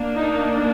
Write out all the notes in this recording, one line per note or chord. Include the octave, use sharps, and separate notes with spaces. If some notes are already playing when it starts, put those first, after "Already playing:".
Already playing: A#3 D4
D#4